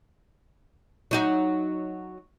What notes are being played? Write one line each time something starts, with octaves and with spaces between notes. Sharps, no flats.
F#3 D#4 F#4